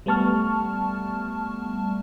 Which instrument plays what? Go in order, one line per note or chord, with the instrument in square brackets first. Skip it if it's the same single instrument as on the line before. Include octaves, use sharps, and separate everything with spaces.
[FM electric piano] G3 A3 B3 A5 C#6 F6